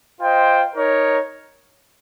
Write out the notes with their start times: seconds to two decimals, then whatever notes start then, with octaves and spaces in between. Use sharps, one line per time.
0.20 F4 C5 D#5 G5
0.75 D#4 A#4 C#5